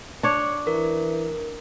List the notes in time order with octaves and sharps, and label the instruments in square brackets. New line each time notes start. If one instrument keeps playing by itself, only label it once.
[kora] D4 C#5
[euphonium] E3 [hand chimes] A#4